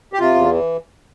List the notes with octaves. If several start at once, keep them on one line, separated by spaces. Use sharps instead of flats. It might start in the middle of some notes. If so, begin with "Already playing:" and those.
G4
C3 F4
E2
E3